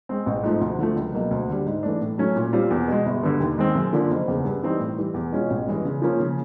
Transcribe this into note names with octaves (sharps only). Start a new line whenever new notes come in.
G#3 C4
A1
G#2 F3 A3
D2
D3 F3 A3
C#2
B2 F#3 A#3
D2
D3 G3
G#2
E3 A3 D4
A2
F#3 A3 C#4
A#2
G3 C4 F4
E2
B2 G#3
G1
G2 D3
D#2
D#3 G#3 C4
F#2
D3 F3 A#3 D4
F#1
E2 C#3
G2
E3 G3 C4 D#4
A2
E3 G3
E2
B2 G#3 C#4 F4
A1
G2 E3 G#3
C#3
F3 A#3 C#4
C#3